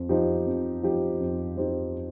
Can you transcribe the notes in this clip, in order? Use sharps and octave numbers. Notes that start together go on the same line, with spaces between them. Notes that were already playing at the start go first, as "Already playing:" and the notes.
Already playing: F2
F3 C4 D#4 G4
F2
F3 C4 D#4 G4
F2
F3 C4 D#4 G4